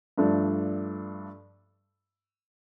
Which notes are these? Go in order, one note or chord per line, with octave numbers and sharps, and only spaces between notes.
G2 F3 A3 D4